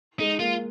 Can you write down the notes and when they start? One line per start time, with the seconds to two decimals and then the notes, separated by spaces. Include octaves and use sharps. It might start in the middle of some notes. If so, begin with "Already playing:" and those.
0.20 G#3 D#4
0.39 A#3 F4